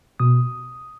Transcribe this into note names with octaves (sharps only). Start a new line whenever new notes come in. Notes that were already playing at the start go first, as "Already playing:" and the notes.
B2 D#6